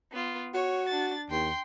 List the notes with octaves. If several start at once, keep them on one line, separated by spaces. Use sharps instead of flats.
B3 F4
F#4 C#5
D4 A6
D#2 G5 C6